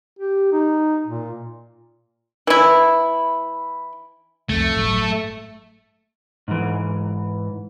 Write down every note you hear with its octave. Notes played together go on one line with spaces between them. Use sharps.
G4
D#4
A#2
E3 E4
C2 F2 A3
G1 A2 F#3
G#2 E3